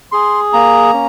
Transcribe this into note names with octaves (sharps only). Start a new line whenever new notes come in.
G#4 C6
A#3 A#5
C#4